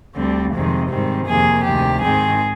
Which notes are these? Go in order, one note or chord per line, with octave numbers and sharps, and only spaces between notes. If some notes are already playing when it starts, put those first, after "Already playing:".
D2 D3 G3 C4
F2 C3 D#3 G#3 C4
G#2 D#3 G3 C4
F2 C3 D#3 A#3 G#4
D2 C3 D#3 G4
G#2 D#3 G#3 C4 G#4